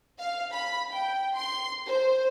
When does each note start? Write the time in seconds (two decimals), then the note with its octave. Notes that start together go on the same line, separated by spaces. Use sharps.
0.18 F5
0.52 B5
0.94 G5
1.35 C6
1.87 C5